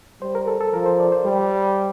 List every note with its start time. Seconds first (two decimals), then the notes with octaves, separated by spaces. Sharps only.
0.21 G3 C5
0.35 A#4
0.47 A4
0.61 A4
0.74 F3 A#4
0.86 C5
1.00 D5
1.12 C5
1.25 G3